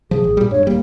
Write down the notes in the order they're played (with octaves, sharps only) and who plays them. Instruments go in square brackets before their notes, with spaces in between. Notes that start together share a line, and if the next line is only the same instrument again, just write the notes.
[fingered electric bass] C3 F3 [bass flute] G#4
[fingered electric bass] A1
A#2 G3
[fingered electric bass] G2 [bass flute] C#5
[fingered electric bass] D#1 G3 [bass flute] A#3